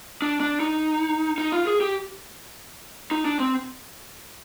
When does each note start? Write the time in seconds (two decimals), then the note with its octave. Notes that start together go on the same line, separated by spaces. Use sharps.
0.22 D4
0.40 D4
0.60 D#4
1.38 D#4
1.52 F4
1.67 G#4
1.81 G4
3.11 D#4
3.25 D4
3.40 C4